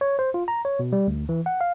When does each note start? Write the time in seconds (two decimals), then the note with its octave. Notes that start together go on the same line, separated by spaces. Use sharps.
0.01 C#5
0.19 C5
0.34 F4
0.48 A#5
0.65 C#5
0.79 B2
0.93 G3
1.07 D2
1.29 E3
1.46 F#5
1.61 F5